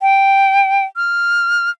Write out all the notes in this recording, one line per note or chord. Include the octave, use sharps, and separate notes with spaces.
G5
F6